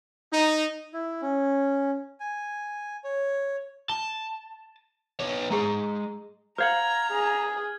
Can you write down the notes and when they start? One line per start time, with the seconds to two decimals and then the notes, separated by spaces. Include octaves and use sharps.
0.32 D#4
0.94 E4
1.22 C#4
2.20 G#5
3.04 C#5
3.89 A5 G7
5.20 B3 C#5
5.51 G#3 G#4 C5 A#5
6.58 C5 F5 F#5 A#5 F6 G#6 F#7
7.11 G#4